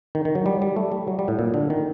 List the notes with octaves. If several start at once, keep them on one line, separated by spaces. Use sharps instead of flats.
D#3
D#3
F#3
G3
G3
A3
G3
F#3
G3
A2
A#2
D3
D#3